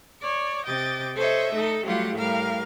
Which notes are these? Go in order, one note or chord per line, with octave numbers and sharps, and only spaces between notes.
C#5 D5
C3 D#5 G5 D6 A6
A4 C5 C#5 D#5 E5
A3 D#4 A4
F#3 G3 A3 F4 G4 F#5
A2 G3 A#4 F5 F6